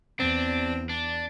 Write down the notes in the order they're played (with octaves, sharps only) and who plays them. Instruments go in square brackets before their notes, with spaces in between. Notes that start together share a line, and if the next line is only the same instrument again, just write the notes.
[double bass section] E2 [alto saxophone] C4 [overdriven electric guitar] D4
[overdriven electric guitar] D4